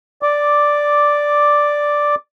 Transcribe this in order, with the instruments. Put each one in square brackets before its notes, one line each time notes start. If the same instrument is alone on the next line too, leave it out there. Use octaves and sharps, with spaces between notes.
[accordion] D5 D6